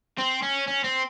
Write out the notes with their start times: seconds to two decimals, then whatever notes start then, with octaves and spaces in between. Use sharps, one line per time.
0.19 C4
0.43 C#4
0.68 C#4
0.84 C4